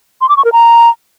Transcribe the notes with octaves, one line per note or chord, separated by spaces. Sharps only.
C6
D6
C#6
A#4
A#5